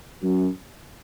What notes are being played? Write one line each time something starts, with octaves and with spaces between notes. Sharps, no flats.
F#2